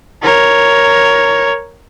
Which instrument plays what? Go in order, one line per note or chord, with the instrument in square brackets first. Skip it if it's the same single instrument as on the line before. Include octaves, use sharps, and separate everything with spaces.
[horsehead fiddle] A#4 C#5